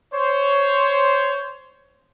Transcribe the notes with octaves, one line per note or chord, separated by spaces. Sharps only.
C5 C#5